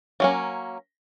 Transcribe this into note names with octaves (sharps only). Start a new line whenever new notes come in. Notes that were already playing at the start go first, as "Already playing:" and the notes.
F#3 A#3 C#4